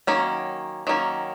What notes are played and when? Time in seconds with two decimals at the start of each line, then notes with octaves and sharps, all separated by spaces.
0.07 D#3 F#3 A#3 C#4
0.87 D#3 F#3 A#3 C#4